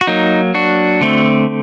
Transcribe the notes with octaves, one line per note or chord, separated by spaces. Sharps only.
F#4
F#3 A#3 D#4
D4 F#4
D3 A3 C4